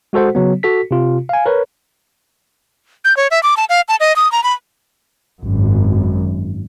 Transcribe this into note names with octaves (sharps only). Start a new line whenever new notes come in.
G#3 F#4 A4 C5 F#5
C#3 F#3 B3
F#4 A4 B6
C3 F4
F5 G#5
A#4 B4 C#5
G6
C#5
E5
D6
A5
F5
A5
D#5
D#6
A#5
B5
G#1 F#2